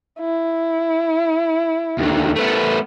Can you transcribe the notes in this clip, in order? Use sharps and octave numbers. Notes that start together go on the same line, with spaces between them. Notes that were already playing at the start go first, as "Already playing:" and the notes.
E4
D#2 D3
A3 B3